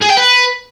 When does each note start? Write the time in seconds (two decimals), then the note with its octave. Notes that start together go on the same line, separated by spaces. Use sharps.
0.01 G#4
0.09 G5
0.17 B4